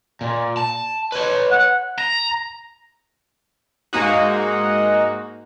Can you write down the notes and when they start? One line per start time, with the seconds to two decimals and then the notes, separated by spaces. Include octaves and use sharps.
0.21 A#2
0.57 A5
1.12 B4 C#5
1.51 F#5
1.98 A#5
3.93 G#2 G#3 A#3 D#4 F#4